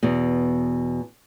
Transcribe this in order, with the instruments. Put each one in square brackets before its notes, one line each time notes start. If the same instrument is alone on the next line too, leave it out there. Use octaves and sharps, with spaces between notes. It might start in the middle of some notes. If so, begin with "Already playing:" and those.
[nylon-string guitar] E2 B2